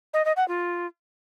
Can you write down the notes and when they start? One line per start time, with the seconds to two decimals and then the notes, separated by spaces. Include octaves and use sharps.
0.14 D#5
0.25 D#5
0.37 F#5
0.48 F4